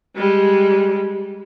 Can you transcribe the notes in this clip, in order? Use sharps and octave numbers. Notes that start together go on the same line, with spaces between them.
G3 G#3